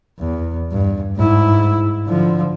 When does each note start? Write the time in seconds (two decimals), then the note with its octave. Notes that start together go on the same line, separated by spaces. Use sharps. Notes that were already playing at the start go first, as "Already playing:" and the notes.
0.20 E2
0.71 G2
1.17 G#2 E4
2.07 D3 F3